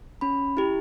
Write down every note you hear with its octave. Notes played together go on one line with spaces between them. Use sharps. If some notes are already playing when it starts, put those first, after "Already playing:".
C#4 B5
E4 G4